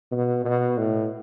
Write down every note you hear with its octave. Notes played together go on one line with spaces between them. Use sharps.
B2
B2
A2